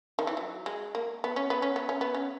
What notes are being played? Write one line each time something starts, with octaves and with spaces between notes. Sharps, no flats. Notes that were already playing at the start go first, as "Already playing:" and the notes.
D#3
E3
F#3
G#3
A#3
B3
C#4
B3
C#4
B3
C#4
B3
C#4